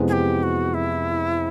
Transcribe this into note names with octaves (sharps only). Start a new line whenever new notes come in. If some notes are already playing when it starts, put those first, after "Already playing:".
Already playing: F2 C3 E3 G#3 B3
G#4
G4
F#4
E4